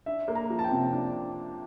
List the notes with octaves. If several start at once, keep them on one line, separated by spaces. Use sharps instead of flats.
D4 E5
A#3
A#5
F3
A5
G5
C3
D4